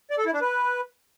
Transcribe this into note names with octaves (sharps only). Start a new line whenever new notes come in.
D5
A4
E4
D4
B4